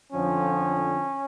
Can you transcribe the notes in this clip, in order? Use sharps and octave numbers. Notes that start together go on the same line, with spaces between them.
F2 D3 F3 C#4